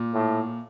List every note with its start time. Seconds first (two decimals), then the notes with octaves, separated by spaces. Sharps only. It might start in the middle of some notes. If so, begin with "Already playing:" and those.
Already playing: A#2
0.13 A2